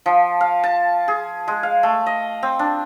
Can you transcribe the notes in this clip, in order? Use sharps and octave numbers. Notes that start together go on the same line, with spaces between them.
F3
F5
A5
G#4
G#3
F5
A3
D#5
C4
D4